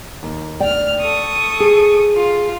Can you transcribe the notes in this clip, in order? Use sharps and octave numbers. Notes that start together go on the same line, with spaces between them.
D#2
D2 D5 G5 F6
A4 C#6 D#6
G#4
F4